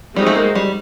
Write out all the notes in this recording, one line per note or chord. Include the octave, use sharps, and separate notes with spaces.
G3 G#3 C4 D#4 F#4
A3
A#3
G3